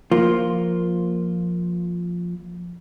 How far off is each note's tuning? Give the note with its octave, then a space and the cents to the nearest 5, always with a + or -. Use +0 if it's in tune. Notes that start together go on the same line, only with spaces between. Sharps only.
F3 +5 A#3 +0 F4 +0